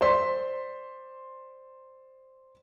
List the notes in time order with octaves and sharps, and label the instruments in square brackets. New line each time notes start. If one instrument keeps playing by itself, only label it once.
[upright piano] C5 D5 C6 B6